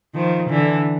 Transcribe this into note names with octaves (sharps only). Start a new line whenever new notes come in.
D#3 F3
D3 E3